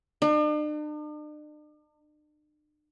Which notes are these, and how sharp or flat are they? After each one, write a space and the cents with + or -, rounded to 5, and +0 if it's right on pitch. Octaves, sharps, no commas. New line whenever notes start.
D4 +45